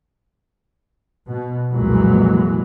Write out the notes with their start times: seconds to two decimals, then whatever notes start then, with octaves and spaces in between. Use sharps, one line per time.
1.27 B2
1.70 C2 F2 A#2 E3 F#3 G#3